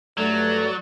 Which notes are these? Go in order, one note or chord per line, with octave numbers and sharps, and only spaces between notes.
G2 F#3 A3 D5